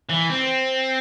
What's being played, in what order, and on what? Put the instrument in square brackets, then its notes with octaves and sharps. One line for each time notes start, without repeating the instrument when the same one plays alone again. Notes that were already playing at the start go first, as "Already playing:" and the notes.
[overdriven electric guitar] E3
C4